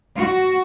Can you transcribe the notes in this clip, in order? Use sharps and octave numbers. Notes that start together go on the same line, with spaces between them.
F#4